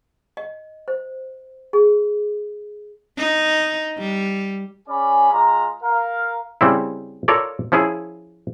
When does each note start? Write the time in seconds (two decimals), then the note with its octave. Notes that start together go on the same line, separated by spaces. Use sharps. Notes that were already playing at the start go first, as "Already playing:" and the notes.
0.37 D#5
0.88 C5
1.73 G#4
3.18 D#4
3.99 G3
4.88 C#4 G#4 D5 G#5 B5
5.32 G#3 F4 A#5
5.82 A#4 F5
6.61 C#3 G3 C4 E4
7.28 F4 A4 A#4 C#5 D5
7.72 F3 C#4 E4 G#4